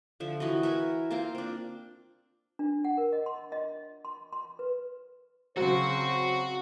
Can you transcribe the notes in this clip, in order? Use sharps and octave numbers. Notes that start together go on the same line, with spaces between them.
D3 F3 E5
E3 F#4 B4 D#5
A#4 E5 F#5 G#5
A#3 C4 F4 A#5
C4 D4
D4
F#5
A#4
D#5
C6
D#5
C6
C6
B4
C#3 F#3 C4 F#4 C5